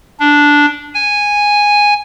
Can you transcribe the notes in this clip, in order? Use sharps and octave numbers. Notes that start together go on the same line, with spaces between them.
D4
G#5